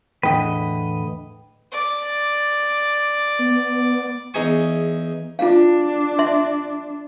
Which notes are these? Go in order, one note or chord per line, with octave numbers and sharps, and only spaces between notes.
E2 A2 D3 B4 D#5 G5
D5
B3
E2 D#4 G#4 G#5 C#6
D4 F4 F5
E5 C6